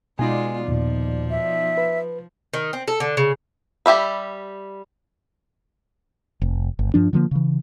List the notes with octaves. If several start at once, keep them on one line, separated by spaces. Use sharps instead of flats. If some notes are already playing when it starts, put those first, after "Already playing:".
B2 G#3 D#4 F4 D5 G#5
D#2 A#2 F3
E5
B4
D#3
C4
A4
D3
C#3
G3 G4 E5 B5
F1
G1
G2 F3 D4
D3 F3 G3 A#3
C#3 E3